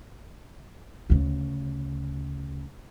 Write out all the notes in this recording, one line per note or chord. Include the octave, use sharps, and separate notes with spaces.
D2 C#3